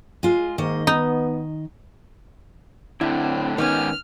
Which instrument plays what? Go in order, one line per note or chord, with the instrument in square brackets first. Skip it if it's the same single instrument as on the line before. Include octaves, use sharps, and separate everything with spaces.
[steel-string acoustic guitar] G#3 F4
[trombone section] G#2 A#3 [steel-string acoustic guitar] D#3 D#5
[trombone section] B3 [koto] D#4
[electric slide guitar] A2 D3 [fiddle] C4 [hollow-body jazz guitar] E4
[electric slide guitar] G#2 G4 G#5 [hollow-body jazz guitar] D#3 B3 C#4 [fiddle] F6